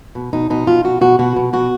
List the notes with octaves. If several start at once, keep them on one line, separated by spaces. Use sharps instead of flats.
B2
B2 D#4
B2 D#4
B2 F4
B2 F#4
B2 F#4
B2 F#4
B2
B2 F#4